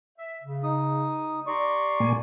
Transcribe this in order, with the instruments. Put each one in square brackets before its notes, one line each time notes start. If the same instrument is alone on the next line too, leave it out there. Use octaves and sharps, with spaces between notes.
[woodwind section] E5
C#3
[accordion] D#4 D#6
[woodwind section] G4 A#5 C6 [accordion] D5 C#6
[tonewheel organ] A#2 A#3 G#5